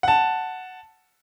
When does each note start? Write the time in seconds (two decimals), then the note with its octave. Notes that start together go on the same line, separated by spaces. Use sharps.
0.03 F#5 A5